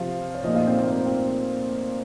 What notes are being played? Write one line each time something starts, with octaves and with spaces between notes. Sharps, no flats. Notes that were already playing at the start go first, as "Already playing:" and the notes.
Already playing: C3 F3 F4 F5
C#5
A#2 F3 D#4 D#5
F4 F5
C4 C5
A#3 A#4
C4 C5
C4 C5